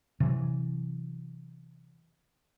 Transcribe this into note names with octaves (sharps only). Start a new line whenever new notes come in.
C3 E3 F#3